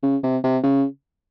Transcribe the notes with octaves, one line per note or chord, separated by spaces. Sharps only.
C#3
C3
C3
C#3